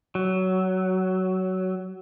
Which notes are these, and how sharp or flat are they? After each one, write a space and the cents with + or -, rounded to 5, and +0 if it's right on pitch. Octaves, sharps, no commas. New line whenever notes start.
F#3 +15